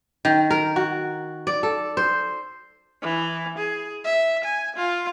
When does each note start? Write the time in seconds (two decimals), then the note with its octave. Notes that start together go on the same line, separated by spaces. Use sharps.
0.25 D#3
0.50 A#4
0.76 F#4
1.47 D5
1.63 A4
1.97 C5
3.02 E3
3.58 G#4
4.05 E5
4.44 G#5
4.76 F4